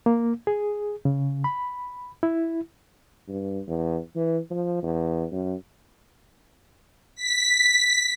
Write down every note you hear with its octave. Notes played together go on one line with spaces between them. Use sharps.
A#3
G#4
C#3
B5
E4
G2
E2
E3
F3
E2
F#2
B6